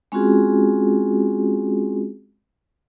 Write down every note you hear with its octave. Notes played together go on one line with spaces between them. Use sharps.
G#3 C4 C#4 F4 F#4 G#4